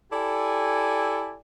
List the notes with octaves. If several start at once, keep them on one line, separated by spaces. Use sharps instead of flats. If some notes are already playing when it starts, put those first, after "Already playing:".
E4 G4 A4 D5 G#5